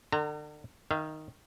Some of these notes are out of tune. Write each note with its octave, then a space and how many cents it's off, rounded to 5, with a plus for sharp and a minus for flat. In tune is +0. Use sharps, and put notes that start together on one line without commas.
D3 +40 A#5 -30
D#3 +0 F5 -45